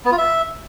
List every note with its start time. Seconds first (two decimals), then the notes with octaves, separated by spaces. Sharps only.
0.05 B3
0.12 F4
0.18 E5